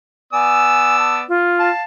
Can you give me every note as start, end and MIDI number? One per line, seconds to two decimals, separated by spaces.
0.33 1.23 59
0.33 1.23 74
0.33 0.96 80
0.33 1.23 88
0.99 1.18 81
1.29 1.70 65
1.59 1.84 77
1.59 1.84 81